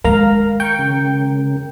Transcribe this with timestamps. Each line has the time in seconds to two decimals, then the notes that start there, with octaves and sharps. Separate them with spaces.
0.04 D#3 G#3 A#4 F5 A#5
0.60 G5 C#6
0.79 C#3